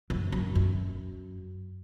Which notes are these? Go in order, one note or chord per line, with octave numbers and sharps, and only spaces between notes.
F#2
F#2
F#2